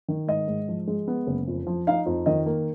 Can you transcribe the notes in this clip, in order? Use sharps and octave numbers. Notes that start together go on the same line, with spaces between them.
D#3
G#2 D#5
G#2
F3
G#3
B3
F#1
F2
F3
D#4 F5
F2
D#3 D#5
A#3